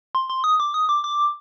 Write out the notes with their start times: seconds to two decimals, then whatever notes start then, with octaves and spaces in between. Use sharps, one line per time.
0.15 C6
0.30 C6
0.44 D#6
0.60 D6
0.74 D#6
0.89 D6
1.04 D6